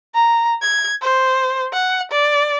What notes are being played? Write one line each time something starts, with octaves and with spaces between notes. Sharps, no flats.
A#5
G#6
C5
F#5
D5